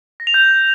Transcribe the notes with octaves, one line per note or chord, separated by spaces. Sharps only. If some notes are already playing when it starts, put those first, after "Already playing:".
A#6
F7
G6